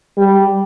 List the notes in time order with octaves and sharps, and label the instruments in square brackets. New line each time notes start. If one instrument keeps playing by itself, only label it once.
[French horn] G3